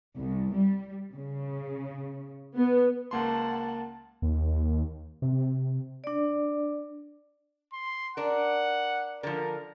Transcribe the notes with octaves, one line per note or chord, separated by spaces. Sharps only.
C2
G3
C#3
B3
C#2 A#3 F#5 A5 C6
D#2
C3
D4 D5
C6
D4 A#4 F#5
D3 F3 A#4